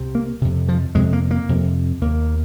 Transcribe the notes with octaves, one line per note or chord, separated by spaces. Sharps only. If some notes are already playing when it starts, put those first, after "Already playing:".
Already playing: C2 C3
A#3
F2 C3
F3
F2 C3 G#3
A#3
A#3
F2 C3
D#2 A#3